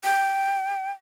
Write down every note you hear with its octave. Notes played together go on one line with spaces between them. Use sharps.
G5